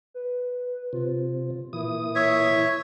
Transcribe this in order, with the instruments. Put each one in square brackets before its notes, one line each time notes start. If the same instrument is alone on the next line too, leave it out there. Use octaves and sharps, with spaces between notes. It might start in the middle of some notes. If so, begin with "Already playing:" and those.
[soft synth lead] B4
[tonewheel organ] C3 [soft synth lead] F4
[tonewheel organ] A#2 E3 D#6 [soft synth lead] E4
[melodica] C#5 E5